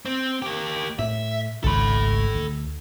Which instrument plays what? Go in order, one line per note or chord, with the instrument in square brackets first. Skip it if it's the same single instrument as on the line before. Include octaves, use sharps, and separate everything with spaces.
[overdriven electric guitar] C4
A#3 G4
[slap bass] A2 [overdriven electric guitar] E5
[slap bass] G#1 C#2 G#2 [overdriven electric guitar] A4 B5
[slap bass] D2